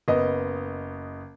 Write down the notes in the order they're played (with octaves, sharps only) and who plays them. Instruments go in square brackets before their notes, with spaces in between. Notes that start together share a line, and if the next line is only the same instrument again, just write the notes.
[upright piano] F#1 B3 D#5